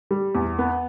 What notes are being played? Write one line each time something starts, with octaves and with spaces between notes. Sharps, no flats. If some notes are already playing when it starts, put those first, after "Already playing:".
G3
E2
B3